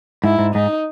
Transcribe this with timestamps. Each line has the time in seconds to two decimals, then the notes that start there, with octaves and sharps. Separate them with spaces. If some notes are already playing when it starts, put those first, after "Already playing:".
0.24 G#2 E4
0.39 G#2
0.55 G#2 D#4